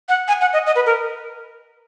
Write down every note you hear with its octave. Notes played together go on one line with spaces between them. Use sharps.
F#5
G#5
F#5
D#5
D#5
B4
A#4